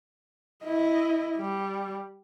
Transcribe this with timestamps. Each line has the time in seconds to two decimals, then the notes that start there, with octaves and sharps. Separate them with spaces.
0.64 E4 D#5
1.37 G3